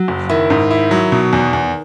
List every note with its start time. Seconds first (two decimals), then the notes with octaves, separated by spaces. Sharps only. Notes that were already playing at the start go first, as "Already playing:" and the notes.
Already playing: F#3
0.08 F#1
0.29 D#3 E4
0.50 G#2
0.71 E4
0.91 F#3
1.12 B2
1.33 E2
1.53 E2